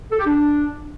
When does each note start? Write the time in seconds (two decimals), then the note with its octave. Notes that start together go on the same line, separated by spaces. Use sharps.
0.12 A4
0.19 G4
0.26 D4